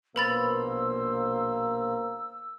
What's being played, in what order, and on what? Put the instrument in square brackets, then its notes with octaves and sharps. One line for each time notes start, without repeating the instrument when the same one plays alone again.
[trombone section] A#1 B2 C5 [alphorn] A#3 [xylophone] B4 B5 A6 [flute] E6